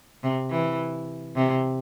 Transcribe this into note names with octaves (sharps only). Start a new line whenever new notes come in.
C3
E3
C3